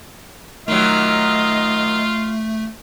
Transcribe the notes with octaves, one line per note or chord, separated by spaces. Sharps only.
D#3 F#3 A3 F4 D#5